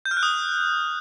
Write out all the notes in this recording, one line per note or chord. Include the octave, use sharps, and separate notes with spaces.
G6
F6
F#6
D#6